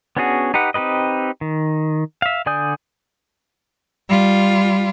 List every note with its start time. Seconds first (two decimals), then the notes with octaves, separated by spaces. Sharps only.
0.17 B3 C#4 D4 F#4 G#4
0.54 D#4 G4 B4 F#5
0.74 C4 D#4 G4 B4 D#5
1.41 D#3
2.22 E5 F5
2.46 D3 D5 G#5 D#6 G6
4.09 G3 F4